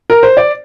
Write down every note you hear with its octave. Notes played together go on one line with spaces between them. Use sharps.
A#4
C5
D5